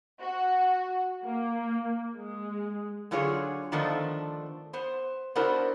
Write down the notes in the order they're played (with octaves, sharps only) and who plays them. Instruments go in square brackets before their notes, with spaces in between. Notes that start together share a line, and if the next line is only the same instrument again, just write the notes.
[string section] F#4
A#3
G#3
[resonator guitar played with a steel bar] D3 F#3 F4 G#4 C#5
D3 D#3 F3 A3 B3 D4
B3 C5
B3 D4 E4 F#4 A#4 C5